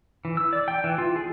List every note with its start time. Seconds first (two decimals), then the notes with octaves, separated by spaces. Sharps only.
0.25 E3
0.37 E6
0.53 D5
0.68 G5
0.84 E3
0.98 F4
1.16 G#4